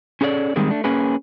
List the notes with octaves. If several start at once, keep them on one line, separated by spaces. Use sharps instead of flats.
C#4 G#4 A4 C#5 D5
D#3 G3 G#3 A#3 C4
A3 D4
A#3 C#4 G#4 B4